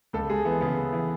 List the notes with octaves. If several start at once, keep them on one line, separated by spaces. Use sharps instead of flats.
C#2 A4
G#3 G#4
E3 B3
C#3 B3
C#3
E3